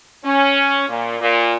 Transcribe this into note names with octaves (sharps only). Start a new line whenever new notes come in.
C#4
A#2
A#2